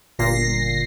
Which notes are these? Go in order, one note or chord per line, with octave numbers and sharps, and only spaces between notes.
G1 A#2 A#6 C7